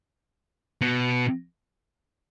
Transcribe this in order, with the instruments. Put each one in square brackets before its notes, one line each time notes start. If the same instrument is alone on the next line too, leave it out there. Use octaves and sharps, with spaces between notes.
[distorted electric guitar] B2